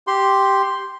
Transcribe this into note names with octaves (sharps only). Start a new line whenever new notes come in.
G4 C6